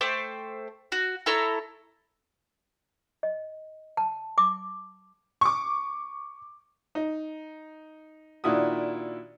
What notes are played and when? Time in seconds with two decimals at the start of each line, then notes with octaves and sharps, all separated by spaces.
0.01 A3 C5 G5 D6
0.92 F#4
1.26 E4 A4 C#5 A#5
3.23 D#5
3.97 A5
4.38 D6
5.41 C#6 D6
6.95 D#4
8.44 A#2 D#3 D4 E4 F#4 D#6